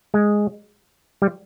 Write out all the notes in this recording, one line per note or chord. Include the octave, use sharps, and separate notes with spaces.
G#3
G3